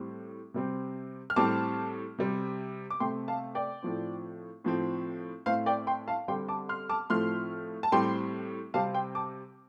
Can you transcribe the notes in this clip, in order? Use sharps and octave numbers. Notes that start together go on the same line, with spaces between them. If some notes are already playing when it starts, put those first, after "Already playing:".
Already playing: A2 G3 C4
C3 G3 C4
F6
A2 G3 C4 A5 D6
C3 G3 C4
D6
C3 A3 C4 G5 C6
F5 A5
D5 G5
A2 F3 C4
A2 F3 C4
A2 A3 C4 C5 F5
D5 G5
G5 C6
F5 A5
D3 G3 C4 G5 C6
A5 D6
C6 F6
A5 D6
A2 F3 A3 C4 C6 F6
A5
A2 G3 C4 G5 C6
C3 G3 C4 F5 A5
G5 C6
A5 D6